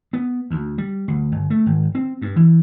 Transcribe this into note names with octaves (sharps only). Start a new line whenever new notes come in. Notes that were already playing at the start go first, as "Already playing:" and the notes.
B3
D2
G3
D2
G1
A3
G#1
C4
G2
E3